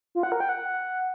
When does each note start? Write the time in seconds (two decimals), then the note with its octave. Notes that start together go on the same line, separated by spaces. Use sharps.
0.15 F4
0.23 F#5
0.32 A#4
0.40 G5
0.49 F#5